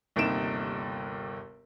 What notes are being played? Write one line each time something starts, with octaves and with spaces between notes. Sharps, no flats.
G1 D#2 C3 D#4 D7 E7